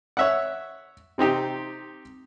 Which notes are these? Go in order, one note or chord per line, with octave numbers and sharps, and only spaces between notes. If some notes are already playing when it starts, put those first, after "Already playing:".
C#5 E5 F#5
C3 C4 D#4 G4